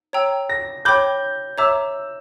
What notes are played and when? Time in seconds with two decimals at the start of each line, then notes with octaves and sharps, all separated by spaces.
0.13 C#5 G5 A#5 E6
0.50 A#6
0.85 C#5 G5 B5 D6 G6
1.58 C#5 E5 A#5 D6 E6